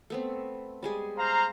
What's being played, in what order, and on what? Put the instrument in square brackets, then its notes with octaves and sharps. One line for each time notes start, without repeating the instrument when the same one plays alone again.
[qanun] A3 B3 C4
G3 G#3 G#4
[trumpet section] C5 F5 A#5